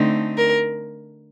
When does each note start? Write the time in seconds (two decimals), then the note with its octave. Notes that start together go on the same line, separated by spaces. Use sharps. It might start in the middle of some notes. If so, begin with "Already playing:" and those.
Already playing: D3 A3 C4 D#4
0.37 A#4